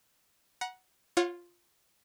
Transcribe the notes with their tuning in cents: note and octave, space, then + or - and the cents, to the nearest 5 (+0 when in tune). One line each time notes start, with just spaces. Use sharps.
F#5 +0 A#5 +40
F4 +0 C#5 -20 F#5 -45